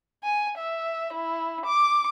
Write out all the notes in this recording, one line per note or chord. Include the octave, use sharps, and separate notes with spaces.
G#5
E5
E4
D6